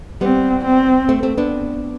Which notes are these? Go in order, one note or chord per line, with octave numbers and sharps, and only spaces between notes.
G3 B3 C4
C4
A3 C4
A3 C4
B3 D4